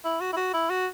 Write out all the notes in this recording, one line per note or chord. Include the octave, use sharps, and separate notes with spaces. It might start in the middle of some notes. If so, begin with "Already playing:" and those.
E4
F#4
E4
F#4
E4
F#4